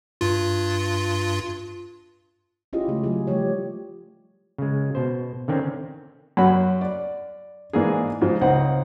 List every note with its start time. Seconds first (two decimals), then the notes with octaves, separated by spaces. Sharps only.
0.21 G2 F4
2.73 C#4 E4 F4 G4 G#4 D#5
2.88 C#3 G#3 A3 G4 G#4
3.04 F#3 F4 G#4
3.27 F3 G3 A3 G4 C#5
4.58 C#3 G#3
4.95 B2 C5
5.48 D3 D#3 C4 C#4
6.37 F#2 F#4 B5
6.81 D5
7.73 G#2 E3 A#3 D4 G#4
8.21 G#2 F3
8.41 C#2 C4 D#4 F#5